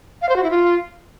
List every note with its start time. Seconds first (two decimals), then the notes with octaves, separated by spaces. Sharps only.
0.22 F5
0.29 C5
0.36 F#4
0.43 E4
0.51 F4